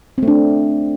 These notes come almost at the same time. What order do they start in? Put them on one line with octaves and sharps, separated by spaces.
C4 A3 D4